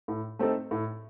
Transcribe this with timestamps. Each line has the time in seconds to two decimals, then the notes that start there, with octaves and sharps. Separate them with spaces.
0.08 A2
0.39 A3 C4 D#4 A4
0.71 A2